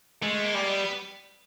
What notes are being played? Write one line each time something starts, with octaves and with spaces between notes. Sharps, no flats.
G#3 A3
A#3
G3
B3